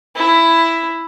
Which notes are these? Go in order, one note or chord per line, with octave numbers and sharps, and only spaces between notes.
E4